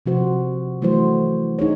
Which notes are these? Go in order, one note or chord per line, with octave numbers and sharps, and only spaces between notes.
C3 F3 F#4 C5
E3 F#3 A3 E4 F#4 C5
D#4 G#4 C#5